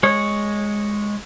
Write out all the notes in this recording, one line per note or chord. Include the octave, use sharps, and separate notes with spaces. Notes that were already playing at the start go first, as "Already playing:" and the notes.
G#3 C#5